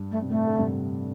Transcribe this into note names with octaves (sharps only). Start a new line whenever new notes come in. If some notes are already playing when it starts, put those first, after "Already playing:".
Already playing: G2
A3
C3
A2 A3
D3
G2 C3